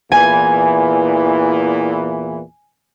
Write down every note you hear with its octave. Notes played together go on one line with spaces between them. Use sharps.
E2 A#2 E3 G#5